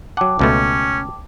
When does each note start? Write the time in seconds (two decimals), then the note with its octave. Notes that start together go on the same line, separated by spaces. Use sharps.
0.17 F#3 F#5 G5 A5 D6
0.39 C#2 B2 A3 C#4